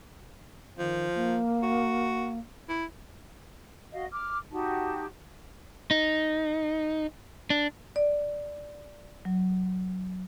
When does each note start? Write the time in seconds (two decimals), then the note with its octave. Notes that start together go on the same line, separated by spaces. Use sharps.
0.78 D#3 F3
1.14 A#3
1.63 F#4
2.69 E4
3.92 F#4 D#5 F5
4.12 D6 F6
4.51 D#4 F#4 G4 A5
5.91 D#4
7.50 D4
7.96 D5
9.25 F#3